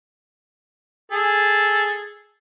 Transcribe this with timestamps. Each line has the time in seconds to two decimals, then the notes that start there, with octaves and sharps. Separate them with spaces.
1.12 G#4 A4